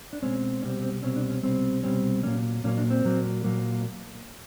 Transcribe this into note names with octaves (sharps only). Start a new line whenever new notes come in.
D4
B2 G#3 C4 C#4
C2 B2 G3 C4 C#4
C4
C2 B2 G3 C4 C#4
D4
C#4
C2 B2 G3 C4 C#4
C2 B2 G3 C4 C#4
A#2 F#3 A#3 C#4
A#2 F#3 A#3 C#4
D4
C4
A#2 F#3 A#3
A#2 F#3 A#3